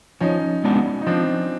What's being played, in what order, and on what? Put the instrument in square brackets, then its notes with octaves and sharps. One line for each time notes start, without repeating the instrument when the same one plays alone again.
[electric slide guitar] F3 [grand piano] C#4 D#4
[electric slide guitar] G#3 B3 D4 F#4
[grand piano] D#4
[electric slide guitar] F3 [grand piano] C4 D4